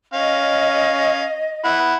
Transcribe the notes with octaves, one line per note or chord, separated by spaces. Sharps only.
C#4 D#5 F5
E4 F#5